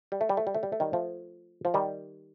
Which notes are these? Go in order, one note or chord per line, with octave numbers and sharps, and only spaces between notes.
G3
A3
G3
A3
G3
A3
G3
A3
D#3 G3
F3 A3
F3
D#3 G3